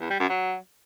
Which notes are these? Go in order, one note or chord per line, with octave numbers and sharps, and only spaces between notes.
E2
G3
F#2
F#3